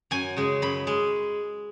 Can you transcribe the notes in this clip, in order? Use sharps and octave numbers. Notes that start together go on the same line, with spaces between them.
F#2 G#5
C#3 G#3
F#2 B5
G#3